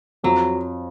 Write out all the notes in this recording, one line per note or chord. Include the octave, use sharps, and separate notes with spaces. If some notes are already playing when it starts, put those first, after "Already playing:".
F2 F#3